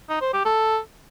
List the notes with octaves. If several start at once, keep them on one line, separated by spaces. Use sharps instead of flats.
D#4
C5
G4
A4